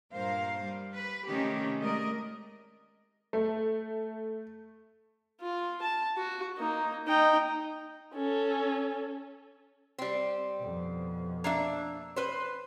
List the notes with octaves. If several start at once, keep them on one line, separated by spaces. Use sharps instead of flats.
G2 A#2 A#4 C5 F5
G3
B4
C3 D#3 A3 C#4 G4
G#3 A3 A#4 D5 D#5
A3
F4
A5
F#4
A#3 D#4
D#4 G5
C#4 A4
G3 C4
F2 B2
A#3 D4 E5
B4 C5